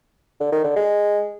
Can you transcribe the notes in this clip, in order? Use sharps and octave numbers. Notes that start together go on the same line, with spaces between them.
D3
D#3
D3
G#3